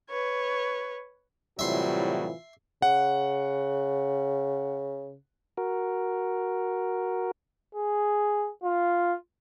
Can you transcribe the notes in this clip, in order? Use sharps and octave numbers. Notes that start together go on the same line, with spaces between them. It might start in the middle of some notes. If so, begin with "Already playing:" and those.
B4 C#5
A2 C3 E3 F#3 G3 F4 E5 C6
C#3 F#5
F#4 A#4
G#4
F4